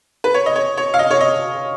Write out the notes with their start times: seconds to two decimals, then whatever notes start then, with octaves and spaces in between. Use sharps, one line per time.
0.24 B4
0.34 C#5
0.46 D#5
0.56 C#5
0.78 C#5
0.94 F5
0.99 D#5
1.11 C#5
1.21 D#5